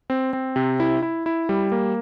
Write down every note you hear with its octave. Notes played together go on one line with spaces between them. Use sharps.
C4
C4
C3
E4
E4
E4
G3
A#3